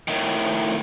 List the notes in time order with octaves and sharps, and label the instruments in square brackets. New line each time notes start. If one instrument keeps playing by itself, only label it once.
[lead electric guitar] A2 D#3